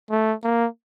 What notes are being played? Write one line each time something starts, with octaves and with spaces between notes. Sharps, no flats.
A3
A#3